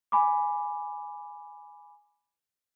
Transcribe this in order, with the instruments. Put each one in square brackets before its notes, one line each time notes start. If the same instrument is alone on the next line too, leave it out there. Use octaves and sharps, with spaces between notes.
[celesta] G#5 B5 D6